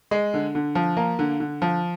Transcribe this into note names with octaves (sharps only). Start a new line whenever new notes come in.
G#3
D3
D3
F3
A#3
D3
D3
F3